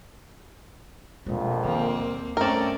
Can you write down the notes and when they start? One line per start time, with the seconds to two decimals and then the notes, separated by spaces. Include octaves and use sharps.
1.26 A#1 F2 B2 G#3
1.64 D#3 A#3 C4
2.00 D#2
2.37 G2 A3 C4 C#4 A#4 D5